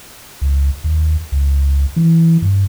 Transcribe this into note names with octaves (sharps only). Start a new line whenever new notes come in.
C#2
D#2
C#2
E3
G2